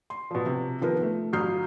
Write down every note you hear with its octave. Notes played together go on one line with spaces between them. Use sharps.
C6
B2 F3
C3
D#3 F3 B3 F4 A#4
A3
G1 F#3 D#6 F6 G6 C7